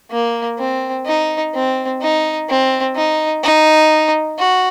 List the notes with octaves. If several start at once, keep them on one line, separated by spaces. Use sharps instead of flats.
A#3
C4
D#4
C4
D#4
C4
D#4
D#4
F#4